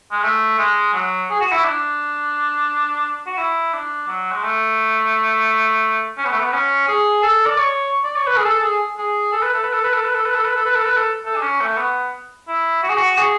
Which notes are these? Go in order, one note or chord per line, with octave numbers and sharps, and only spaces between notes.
G#3
A3
G#3
F#3
G#4
F#4
E4
D4
F#4
E4
D4
F#3
G#3
A3
C#4
B3
A3
B3
C#4
G#4
A4
D5
C#5
D5
C#5
B4
G#4
A4
A4
G#4
G#4
A4
B4
A4
B4
A4
B4
A4
B4
A4
B4
A4
B4
A4
B4
A4
B4
A4
A4
D4
C#4
A3
B3
E4
F#4
G#4
F#4
G#4